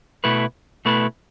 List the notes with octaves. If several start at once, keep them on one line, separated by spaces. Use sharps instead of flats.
B2 A3 E4 B4
B2 A3 E4 B4